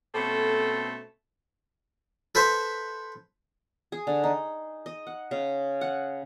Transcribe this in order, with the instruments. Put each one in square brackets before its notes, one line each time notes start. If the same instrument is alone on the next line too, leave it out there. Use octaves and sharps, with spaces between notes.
[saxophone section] B2 A3 C4 C#4 A4
[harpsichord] A4 B4 C5 E5
[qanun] G#4
D3
D#4
D#5
F#5
C#3
F#5